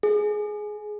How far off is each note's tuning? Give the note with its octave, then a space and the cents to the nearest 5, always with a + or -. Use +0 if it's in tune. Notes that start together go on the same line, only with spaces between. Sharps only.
G#4 +10